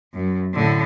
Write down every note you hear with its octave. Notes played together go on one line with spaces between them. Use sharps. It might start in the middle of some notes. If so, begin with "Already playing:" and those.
F#2
A2 D3